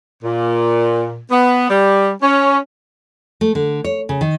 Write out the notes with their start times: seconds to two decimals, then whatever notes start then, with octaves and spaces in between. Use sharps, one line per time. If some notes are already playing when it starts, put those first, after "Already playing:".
0.23 A#2
1.31 B3
1.69 G3
2.22 C#4
3.41 A3
3.55 D3
3.84 C#5
4.09 C#3
4.21 D#3